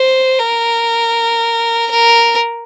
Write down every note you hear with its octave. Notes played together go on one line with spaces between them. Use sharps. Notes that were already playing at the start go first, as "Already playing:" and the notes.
Already playing: C5
A#4
A#4